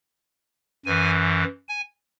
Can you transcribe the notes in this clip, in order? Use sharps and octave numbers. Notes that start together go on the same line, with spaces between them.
F#2 E3 G#5
G#5